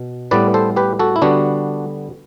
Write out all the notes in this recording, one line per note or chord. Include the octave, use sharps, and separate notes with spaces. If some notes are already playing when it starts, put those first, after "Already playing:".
Already playing: B2
A2 G3 B3 B4 D5
A4 C5
G4 B4
F#4 A4
E4
D3 G3 B3 D4 F#4